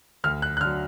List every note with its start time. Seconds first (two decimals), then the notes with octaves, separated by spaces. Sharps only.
0.24 D2 F6
0.42 F#6
0.57 F#6
0.61 D3 F#3 F6